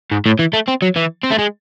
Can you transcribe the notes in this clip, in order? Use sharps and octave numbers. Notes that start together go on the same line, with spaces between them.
G#2
A2
E3
A3
C4
F#3
E3
C4
A3
G#3